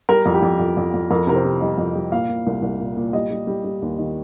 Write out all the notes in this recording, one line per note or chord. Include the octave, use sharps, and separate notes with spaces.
G3 A#4
F2
G4
F2
F2
F2
F2
F2 A#4
C3 A#4
C5
C3
G3 D#5
F2
G3
A#2 F5
A#2
C2
C2
A#2
A#2
G3 D#5
G3
G3
G3
D#2
D#3